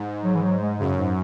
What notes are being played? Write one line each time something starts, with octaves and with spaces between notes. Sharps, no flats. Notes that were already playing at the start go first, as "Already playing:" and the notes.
Already playing: G#2
F#3
E3
F#3
G#3
F#2 C#3
G#2